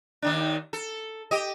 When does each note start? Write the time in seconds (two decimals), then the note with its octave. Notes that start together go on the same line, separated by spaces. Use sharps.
0.22 D#2 D#3 D4
0.73 A4
1.31 G4 D#5